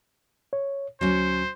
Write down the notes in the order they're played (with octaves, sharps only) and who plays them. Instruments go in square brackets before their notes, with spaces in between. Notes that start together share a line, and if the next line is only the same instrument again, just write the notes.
[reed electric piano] C#5
[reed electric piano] D2 [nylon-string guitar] F#3 C#4 [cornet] C5